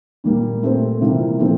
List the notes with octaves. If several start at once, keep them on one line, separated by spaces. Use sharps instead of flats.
A#2 G3 A#3
A#2 A3 C4 G4 C5
C3 E3 G3 A#3 F4
A#2 F3 A3 C4 E4